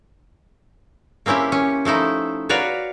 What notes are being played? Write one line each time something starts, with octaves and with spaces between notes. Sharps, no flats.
A#3 C4 C#4 E4 G4
C#4
F3 A3 D#4 E4
F#4 B4 C#5 D5 F5 A#5